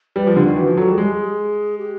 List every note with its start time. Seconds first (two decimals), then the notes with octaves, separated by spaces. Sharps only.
0.16 G3 B4
0.27 F3
0.36 D3 F4
0.46 D#3
0.56 E3 F#4
0.67 F3
0.77 F#3 A4
0.87 G3 G#4
0.98 G#3
1.04 G4
1.17 G#4
1.78 G4